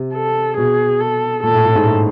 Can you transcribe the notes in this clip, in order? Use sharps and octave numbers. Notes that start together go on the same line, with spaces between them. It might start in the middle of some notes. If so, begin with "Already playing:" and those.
Already playing: C3
A4
B2 G#4
A4
A#2 A4
A2
A2
G#2
A2